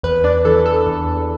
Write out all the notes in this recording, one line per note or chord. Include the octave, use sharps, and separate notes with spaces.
E2 B4
D4 D5
E3 D4 A4
A4
E2